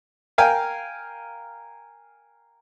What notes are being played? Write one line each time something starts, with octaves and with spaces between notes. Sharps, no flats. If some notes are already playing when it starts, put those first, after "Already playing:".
A#4 F5 G5 G#5